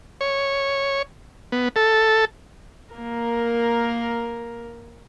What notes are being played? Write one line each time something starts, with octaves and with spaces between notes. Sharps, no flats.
C#5
B3
A4
A#3 A#4